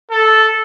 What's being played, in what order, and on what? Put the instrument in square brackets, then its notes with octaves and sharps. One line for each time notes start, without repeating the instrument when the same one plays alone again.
[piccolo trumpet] A4